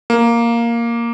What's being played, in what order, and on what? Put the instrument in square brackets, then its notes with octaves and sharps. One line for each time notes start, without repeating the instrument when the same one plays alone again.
[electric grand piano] A#3